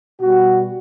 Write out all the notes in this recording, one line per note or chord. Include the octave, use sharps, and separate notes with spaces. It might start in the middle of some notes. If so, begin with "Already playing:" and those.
B2 G3 F#4